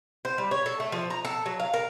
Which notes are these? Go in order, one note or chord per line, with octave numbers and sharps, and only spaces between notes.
C5
G3
C#5
A4
A3
F3
A#5
A4
F#3
F5
A#4